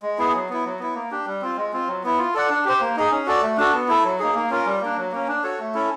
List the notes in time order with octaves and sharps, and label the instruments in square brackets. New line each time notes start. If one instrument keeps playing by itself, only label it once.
[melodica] G#3
B3 E4 G#4
F#3
B3 E4
F#3
B3 E4
A#3
D4 G4
G3
C4 F4
G#3
C4 F4
F#3
B3 E4
F4
A4 D5 F#5
D4
G4 C5
A#3
D#4 G#4
C#4
F#4 A4 D5
A3
D4 F#4 A4
B3
E4 A4
F#3
A#3 D#4 G#4
A#3
C#4 F4 A#4
G3
A#3 D4
F#3
A#3 C#4
D4
F#4 A4 C#5
A3
C#4 E4 A4